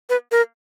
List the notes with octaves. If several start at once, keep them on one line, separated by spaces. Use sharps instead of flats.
B4
A#4